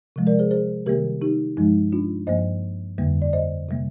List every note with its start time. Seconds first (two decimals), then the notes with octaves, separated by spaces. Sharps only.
0.16 C3 F3 G#3
0.27 A#4 D5
0.39 G#4 C5
0.51 G#4 C5
0.86 C3 D#3 G3 A#3 G4 A#4
1.22 D#4 G4
1.57 G2 F3 G#3 D#4
1.92 D4 F4
2.27 G2 F3 A#3 C5 D#5
2.98 F2 D3 G3 A#3
3.22 D5
3.33 C5 D#5
3.69 C3 G3 A#3